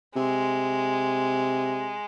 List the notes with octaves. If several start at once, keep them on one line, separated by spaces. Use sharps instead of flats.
C3 G#3